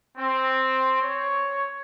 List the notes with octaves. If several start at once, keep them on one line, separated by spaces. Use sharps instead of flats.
C4
C#5